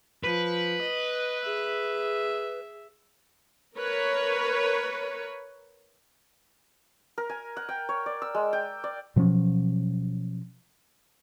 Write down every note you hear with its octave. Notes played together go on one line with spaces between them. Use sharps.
F3 B4
D#5
G#4 E5
A#4 B4 C#5
A#4
G#5
F#5
G5
C#5
D5
E6
G#3
G5
D5
B2 F3 F#3 C#4